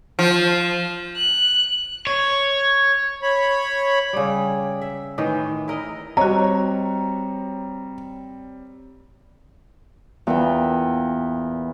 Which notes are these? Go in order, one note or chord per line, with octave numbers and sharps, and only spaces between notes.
F3
F#6
C#5
C#5 B5
C#3 G3
E5
A2 D#3 E3
E4 A#4 D#5
G3 C4 F#4 C#5 D#5 A#5
E2 A#2 B3 G5